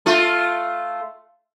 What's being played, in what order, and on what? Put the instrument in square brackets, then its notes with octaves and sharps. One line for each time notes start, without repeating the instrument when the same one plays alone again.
[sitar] A3 F4